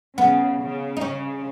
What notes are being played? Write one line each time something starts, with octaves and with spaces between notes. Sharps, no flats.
C#3 B3
C#3
D#4
C#3 C#4